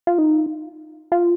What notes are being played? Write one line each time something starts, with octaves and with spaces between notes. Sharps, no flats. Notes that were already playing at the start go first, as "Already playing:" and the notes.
F4
D#4
F4